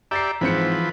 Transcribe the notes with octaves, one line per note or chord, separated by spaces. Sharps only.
G4 D5 E5 A#5 A6 C7
G#2 E3 F3 C4 B4 C#7